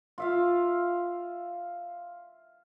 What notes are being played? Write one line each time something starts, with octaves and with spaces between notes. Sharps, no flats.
F4 E5 F5